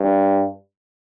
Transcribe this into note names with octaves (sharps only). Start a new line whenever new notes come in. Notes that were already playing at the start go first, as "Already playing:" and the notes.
Already playing: G2